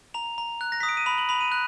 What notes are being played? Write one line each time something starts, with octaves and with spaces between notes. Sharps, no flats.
A#5 F7
A#5
F#6
A#6
D#6 B6
D7
D#7
B5 F7
F#7
B5 F7
D#7
F#6